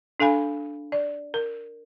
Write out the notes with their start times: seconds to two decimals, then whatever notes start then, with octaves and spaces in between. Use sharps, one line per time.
0.20 D4 A4 F5 G#5 B5
0.92 D5
1.34 A#4